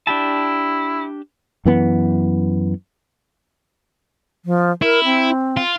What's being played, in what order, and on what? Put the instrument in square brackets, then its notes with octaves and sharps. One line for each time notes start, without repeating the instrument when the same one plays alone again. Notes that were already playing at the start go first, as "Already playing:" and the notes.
[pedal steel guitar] D4 G4 A5 [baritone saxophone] E4
[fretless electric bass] F#2 E3 B3
[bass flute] F3
[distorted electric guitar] E4 [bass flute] A#4
[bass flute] C4
[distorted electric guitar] F4